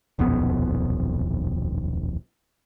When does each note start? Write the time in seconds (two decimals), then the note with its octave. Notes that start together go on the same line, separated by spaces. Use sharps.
0.19 D#1 B1 F2 B3